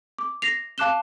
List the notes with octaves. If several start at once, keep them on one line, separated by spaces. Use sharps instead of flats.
D6
A#6 C7 F7
F5 A5 D6 F#6 E7 G7